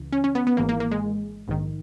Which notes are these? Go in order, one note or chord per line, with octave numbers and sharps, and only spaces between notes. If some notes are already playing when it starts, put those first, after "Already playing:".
Already playing: C#2 C#3 E3
C#4
C#4
B3
B3
G#1 G#2 E3 A#3
A#3
A#3
G#3
A#1 G#2 D#3